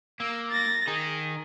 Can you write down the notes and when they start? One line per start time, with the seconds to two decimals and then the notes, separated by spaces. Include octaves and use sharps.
0.20 A#3 E6
0.51 A6 A#6
0.88 D#3 D#4 G#4